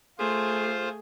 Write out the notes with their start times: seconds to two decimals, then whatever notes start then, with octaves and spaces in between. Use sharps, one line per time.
0.18 A3 F4 G#4 C5